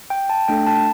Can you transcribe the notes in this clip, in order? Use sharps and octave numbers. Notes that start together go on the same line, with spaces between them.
G5
A5
A3 D4 A4 G5
A5